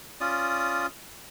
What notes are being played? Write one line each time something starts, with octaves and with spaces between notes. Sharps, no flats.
C#4 F4 D5 D#6